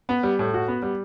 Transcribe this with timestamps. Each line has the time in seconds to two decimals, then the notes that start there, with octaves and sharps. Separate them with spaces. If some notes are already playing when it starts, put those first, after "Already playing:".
0.09 B3
0.23 G3
0.39 A2
0.54 F#4
0.68 B3
0.82 G3